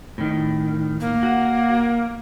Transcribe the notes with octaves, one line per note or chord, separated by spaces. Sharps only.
A2 D#3
A#3
F#4